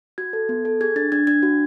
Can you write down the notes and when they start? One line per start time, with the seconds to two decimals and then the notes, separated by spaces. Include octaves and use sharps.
0.18 F#4 G#6
0.33 A4
0.49 B3
0.65 A4
0.81 G#4 G#6
0.96 D4 A6
1.12 D4 G#6
1.27 D4 G#6
1.43 F#4